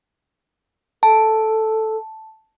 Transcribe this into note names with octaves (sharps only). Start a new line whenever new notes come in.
A4 A5